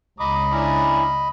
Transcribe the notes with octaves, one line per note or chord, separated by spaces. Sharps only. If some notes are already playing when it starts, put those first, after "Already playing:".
C#2 C#3 D#5 A#5 B5 D6 D#6
C#4 D4 E4 D5 A#5